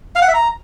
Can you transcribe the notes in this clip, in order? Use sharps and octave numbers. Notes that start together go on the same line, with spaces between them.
F5
F#5
E5
A#5